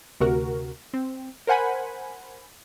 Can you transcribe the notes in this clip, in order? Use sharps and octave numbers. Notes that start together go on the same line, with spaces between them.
D2 C3 F#4 A#4
C4
A#4 C5 F#5 G#5 B5